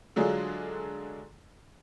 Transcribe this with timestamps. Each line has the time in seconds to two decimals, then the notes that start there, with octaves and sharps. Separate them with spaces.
0.16 D3 F#3 G#3 D4 F4 G#4